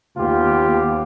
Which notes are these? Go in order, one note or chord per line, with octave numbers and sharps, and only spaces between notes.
D#2 B3 F4 G4